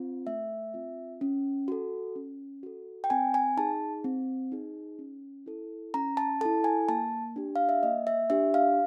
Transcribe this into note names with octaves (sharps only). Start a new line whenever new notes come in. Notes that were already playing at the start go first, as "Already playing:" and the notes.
Already playing: C4 F4
A3 E5
C4 F4
C#4
F#4 A4
C#4
F#4 A4
G5
C4 G#5
G#5
D#4 G#4 A5
C4
D#4 G#4
C#4
E4 A4
C#4 A#5
A5
E4 A4 A5
G#5
A#3 A5
D4 G4
F5
E5
A#3 D#5
E5
D4 G4 E5
F5